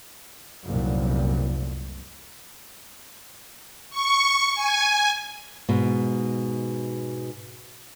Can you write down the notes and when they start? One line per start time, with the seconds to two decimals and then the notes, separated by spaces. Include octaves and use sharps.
0.64 F1 C2 F#2 A#2
3.90 C#6
4.55 G#5
5.69 G#2 B2